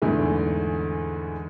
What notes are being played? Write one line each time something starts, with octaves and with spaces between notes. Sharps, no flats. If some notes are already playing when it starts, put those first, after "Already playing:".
E2 G#2 D3 E3 A3